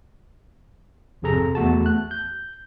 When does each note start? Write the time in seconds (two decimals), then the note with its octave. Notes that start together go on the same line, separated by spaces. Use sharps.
1.22 G#1 F2 C3 G#4 A4 A#5
1.55 E2 A3 F#4 A5
1.86 F#6
2.11 G6